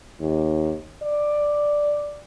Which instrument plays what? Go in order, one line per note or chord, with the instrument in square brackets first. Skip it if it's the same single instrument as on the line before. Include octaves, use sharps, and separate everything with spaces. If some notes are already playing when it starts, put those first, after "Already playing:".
[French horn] D#2
D5